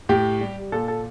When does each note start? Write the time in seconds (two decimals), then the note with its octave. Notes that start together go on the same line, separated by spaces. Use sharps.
0.09 A2 G4
0.41 G3
0.72 A#2 A4
0.88 A4